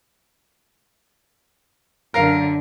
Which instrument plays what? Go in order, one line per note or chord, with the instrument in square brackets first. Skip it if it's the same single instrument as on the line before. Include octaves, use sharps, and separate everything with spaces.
[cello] F#2 D3 [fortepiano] A#4 F5